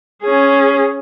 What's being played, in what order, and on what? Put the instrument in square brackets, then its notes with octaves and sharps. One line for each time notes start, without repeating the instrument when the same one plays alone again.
[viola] C#4 G#4